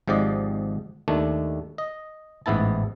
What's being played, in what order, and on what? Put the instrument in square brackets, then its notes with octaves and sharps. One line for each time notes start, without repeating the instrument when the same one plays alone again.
[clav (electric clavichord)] G#1 G#2 F3 G4 D5 D#5
D#2 D#3 A3 D4
D#5
A1 G#2 B3 E4 A5